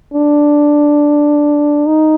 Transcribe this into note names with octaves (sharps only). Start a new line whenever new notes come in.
D4
D#4